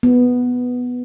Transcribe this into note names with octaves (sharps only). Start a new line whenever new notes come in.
B3